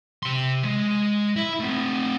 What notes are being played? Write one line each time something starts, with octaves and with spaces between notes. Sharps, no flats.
C3 C6
G#3
E4
A3 C4